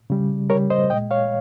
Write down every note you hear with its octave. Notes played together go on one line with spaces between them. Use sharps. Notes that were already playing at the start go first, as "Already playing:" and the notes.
C#3 G3
C#3 G3 A#4 C#5
C5 D#5
A#2 G#3 D#5 G5
C#5 F5